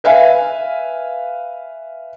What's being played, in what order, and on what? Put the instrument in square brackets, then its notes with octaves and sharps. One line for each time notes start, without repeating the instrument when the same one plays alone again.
[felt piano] B4 E5 F5 G#5